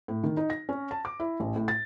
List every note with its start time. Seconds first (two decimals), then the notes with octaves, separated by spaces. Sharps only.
0.08 A2
0.24 D#3
0.37 D#4
0.50 A#6
0.69 C#4
0.91 A5
1.05 D6
1.20 E4
1.40 A1
1.56 A2
1.68 A6